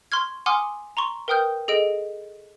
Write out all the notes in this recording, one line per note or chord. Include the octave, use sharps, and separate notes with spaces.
C6 C#6 F6 G#6
F#5 G#5 C6 D6 D#6 F6
A#5 C6 C#6
A#4 B4 G5 D#6 F6 G6
G#4 A4 D#5 D7